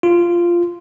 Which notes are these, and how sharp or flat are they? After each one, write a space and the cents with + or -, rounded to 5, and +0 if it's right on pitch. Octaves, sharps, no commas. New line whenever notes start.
F4 -10